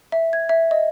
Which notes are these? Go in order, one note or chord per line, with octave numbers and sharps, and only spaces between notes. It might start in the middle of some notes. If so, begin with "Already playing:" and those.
E5
G#6
E5
D#5